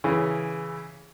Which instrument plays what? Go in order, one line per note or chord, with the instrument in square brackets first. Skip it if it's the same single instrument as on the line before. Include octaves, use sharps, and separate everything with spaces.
[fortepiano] C#3 E3